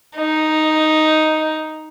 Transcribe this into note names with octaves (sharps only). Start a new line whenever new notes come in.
D#4